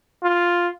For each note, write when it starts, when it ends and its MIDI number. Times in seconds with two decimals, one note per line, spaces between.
0.23 0.69 65